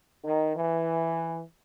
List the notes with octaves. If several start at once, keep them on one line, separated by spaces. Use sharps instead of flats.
D#3
E3